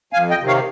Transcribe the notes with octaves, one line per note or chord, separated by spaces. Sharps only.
F2 F5 G#5
D#5 G5
C3 D#3
C#5 F5